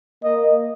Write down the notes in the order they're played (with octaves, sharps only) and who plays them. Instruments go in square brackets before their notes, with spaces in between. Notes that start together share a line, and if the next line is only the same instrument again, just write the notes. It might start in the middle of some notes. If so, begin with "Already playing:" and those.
[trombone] A#3 [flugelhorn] D#5